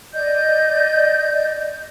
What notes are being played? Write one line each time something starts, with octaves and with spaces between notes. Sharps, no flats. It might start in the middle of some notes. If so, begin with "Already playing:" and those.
D5 D#5 G6